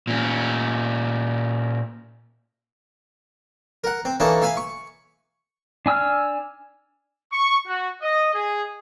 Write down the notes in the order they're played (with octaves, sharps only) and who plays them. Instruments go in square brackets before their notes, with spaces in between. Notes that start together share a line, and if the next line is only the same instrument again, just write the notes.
[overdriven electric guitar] A#2 C#4
[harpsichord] A#4 F#5
C4
E3 A#3 C#4 D#4 A4
E5 F5 G#5 B5
C#6
[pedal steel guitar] D4 G#5 E6 F6
[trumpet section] C#6
F#4
D#5
G#4